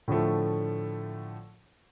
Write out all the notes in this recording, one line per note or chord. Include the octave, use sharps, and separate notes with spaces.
A2 D3 F3 A3